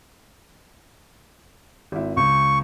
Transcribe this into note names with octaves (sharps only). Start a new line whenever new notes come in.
G#1 E4
C#2 C#6